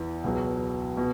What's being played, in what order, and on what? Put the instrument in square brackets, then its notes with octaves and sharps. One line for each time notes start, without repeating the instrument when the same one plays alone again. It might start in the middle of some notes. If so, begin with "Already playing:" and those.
Already playing: [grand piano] E2 E3
C#2 B2 F#3
B2